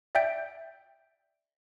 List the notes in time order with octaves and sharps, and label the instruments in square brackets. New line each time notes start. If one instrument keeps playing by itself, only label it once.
[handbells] D5 E5 G5 G6 D7